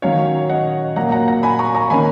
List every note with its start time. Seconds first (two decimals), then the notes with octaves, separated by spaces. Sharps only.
0.02 D#3 F#3 C#4 C#5 F5
0.50 D#5 F#5
0.96 A#2 F#3 A#3 F#5 A#5
1.12 F#5 A#5
1.28 F#5 A#5
1.43 G#5 B5
1.59 A#5 C#6
1.75 A#5 C#6
1.90 D#3 A#3 C#4 G#5 B5